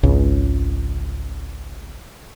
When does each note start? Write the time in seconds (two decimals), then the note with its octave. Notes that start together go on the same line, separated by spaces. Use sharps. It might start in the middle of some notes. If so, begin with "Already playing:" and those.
0.03 G#1 C#2 C#3